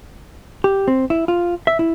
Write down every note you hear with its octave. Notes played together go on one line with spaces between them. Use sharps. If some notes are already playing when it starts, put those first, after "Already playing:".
G4
C4
E4
F4
E5
E4